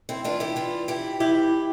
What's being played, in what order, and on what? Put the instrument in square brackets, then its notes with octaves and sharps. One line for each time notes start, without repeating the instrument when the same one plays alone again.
[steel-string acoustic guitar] C4 E4
E3 D4 F4
E4 G4
E3 D4 F4
E3 E4 G4
E3 E4 G4